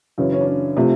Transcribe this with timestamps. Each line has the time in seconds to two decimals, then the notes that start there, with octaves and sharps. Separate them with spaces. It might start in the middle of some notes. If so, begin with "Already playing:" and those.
0.18 F#2 C#3 E3 C#4
0.32 C#4
0.41 D4
0.46 C#4
0.77 C3 F3 A3